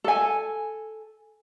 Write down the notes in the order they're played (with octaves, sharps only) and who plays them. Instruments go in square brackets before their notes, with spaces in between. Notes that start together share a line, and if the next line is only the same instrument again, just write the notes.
[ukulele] A4 G#5